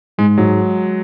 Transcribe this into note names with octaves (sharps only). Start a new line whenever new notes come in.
G#2 G#3
G#2 F#3